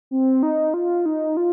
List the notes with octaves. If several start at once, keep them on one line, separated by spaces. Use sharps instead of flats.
C4
D#4
F4
D#4
F4